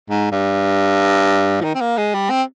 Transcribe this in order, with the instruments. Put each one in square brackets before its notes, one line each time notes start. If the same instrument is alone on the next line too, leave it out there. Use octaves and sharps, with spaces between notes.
[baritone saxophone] G#2
G2
F3
D#3
C4
A#3
G#3
G3
C4